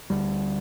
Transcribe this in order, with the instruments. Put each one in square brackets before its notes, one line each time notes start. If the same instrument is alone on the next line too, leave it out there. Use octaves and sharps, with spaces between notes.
[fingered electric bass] D2 D3 G3